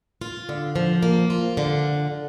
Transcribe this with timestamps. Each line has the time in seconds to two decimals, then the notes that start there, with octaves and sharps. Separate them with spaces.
0.21 F4
0.49 D3
0.76 F3
1.03 A#3
1.30 F4
1.57 D3